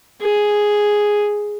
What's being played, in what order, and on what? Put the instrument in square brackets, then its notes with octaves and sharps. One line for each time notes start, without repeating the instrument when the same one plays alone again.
[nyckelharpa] G#4